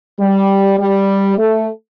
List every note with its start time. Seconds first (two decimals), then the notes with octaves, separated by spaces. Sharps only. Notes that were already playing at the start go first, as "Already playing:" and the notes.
0.19 G3
0.79 G3
1.37 A3